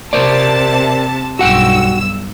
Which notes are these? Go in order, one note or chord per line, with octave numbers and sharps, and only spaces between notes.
C3 A#4 C5 D5 A5
B1 G2 F#4 F#5 G5 E6